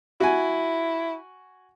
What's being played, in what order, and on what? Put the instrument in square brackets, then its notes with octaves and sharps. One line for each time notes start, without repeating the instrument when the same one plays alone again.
[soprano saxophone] E4 [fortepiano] F#4 G#5